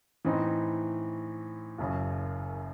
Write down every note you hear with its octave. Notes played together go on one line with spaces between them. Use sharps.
A2 E3 C4 D#4
F#1 F#2 C#3